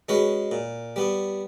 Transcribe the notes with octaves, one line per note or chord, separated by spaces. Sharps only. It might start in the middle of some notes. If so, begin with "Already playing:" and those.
G#3 C#4 F#4 B4
A#2
G3 B3